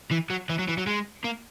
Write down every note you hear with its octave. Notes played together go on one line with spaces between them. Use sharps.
E3
F#3
E3
F#3
E3
F#3
G#3
A#3